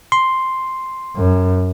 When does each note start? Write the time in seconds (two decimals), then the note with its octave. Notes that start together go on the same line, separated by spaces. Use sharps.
0.12 C6
1.16 F#2